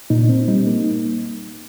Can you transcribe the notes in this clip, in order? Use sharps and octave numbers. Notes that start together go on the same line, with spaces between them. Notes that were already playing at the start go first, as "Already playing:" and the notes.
A#2 D#4
C4
G3 D#4
A#3